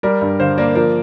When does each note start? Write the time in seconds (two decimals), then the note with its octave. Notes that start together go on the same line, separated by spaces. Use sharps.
0.03 G3 A#4 D5
0.21 G2
0.40 D3 C5 F5
0.58 A#3 A#4 D5
0.75 F3 A#4 D5